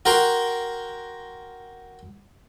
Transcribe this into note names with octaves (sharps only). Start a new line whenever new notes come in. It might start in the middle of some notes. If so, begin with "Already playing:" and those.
F#4 A#4 G5 A#5 C6